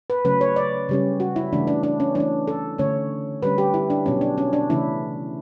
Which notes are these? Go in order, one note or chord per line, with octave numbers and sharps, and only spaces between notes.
B4
C#3 F#3 A3 C#4 B4
C#5
D5
C#3 G3 C#4
F#4
E4
C#3 E3 A3 D4
D4
D4
C#4
E3 A3 C#4 D4
A4
D3 A3 C#4 C#5
D3 G3 C#4 B4
G4
E4
D4
B2 F#3 C#4
D4
C#4
D4
C#3 E3 A3 C#4 E4